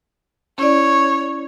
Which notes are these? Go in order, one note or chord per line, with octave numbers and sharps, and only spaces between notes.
C#4 E4 C#5 D5